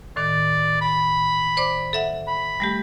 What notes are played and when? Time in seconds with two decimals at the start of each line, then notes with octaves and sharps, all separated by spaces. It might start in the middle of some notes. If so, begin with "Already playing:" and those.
0.16 A2 D#3 D5
0.81 B5
1.57 C5 D5 D6
1.93 A4 E5 F#5
2.27 B5
2.60 G3 A3 G4